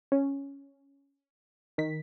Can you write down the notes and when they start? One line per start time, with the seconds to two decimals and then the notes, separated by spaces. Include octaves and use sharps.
0.12 C#4
1.78 D#3 B6